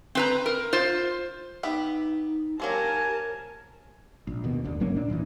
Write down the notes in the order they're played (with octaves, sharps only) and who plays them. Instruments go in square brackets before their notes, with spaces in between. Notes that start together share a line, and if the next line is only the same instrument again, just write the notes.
[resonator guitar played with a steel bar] C4 B4 A#5
A#4
F4 C5
[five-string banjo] B3 G4 E5 [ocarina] D#4
[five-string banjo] F#3 A#3 C4 [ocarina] G4 [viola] A#4 A5 [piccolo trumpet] G#5
[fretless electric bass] A#1
D#2 B2
F1 D2 D3
G1 F#3 A#3 C#4
A#2 D4
D1 D#2 A#2 E3